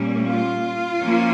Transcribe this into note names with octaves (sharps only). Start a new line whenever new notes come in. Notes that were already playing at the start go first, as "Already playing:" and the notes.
Already playing: A#2 G3 A#3 C#4
F4
F3 A#3 C#4